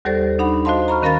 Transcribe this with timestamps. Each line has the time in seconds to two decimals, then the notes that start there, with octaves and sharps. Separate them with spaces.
0.05 D#2 G3 G4 A4 C5 D5
0.39 D4 D#4 F#5 B5
0.65 F#4 C5 D#5 F5 A5 C6
0.88 A#5 B5 C#6 F6
1.02 D#3 C#4 A#4 F5 B5 A6